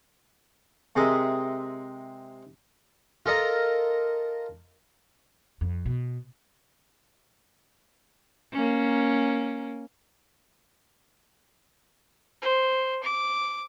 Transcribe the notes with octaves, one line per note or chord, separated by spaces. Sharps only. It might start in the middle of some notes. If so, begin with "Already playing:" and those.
C3 G#3 G#4 A#4 D#5 E5
F4 A4 A#4 D#5 A#5
F2
B2
A#3 C#4
C5
D6